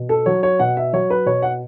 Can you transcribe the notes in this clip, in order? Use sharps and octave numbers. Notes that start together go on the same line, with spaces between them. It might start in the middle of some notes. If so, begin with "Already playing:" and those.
Already playing: B2
A4
F#3 C#5
C#5
B2 F#5
E5
F#3 C#5
B4
B2 C#5
F#5